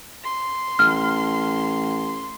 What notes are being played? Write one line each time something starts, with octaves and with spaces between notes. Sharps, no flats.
C6
A1 F6